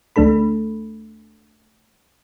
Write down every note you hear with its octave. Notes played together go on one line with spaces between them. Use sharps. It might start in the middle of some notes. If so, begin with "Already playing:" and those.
D2 A3 D4 A4 B5